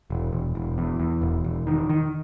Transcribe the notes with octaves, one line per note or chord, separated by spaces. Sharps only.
E1
E1
E1
E2
E2
E1
E1
D#3
D#3